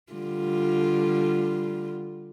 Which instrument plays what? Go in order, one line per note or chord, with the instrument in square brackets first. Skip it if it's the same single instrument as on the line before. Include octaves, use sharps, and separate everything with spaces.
[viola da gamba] D3 G3 F4